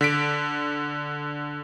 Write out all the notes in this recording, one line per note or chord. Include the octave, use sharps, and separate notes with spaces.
D3 B6 D7